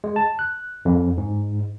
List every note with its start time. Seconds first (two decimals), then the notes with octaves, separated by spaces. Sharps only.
0.04 G#3
0.16 A5
0.39 F#6
0.85 F2
1.18 G#2